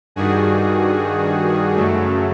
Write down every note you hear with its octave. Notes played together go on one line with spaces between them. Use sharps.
G2 D#3 G3 F#4 G#4
F#2 C#3 F#3 A3